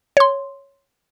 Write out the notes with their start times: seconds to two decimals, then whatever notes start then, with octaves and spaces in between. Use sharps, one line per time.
0.17 C#5 C6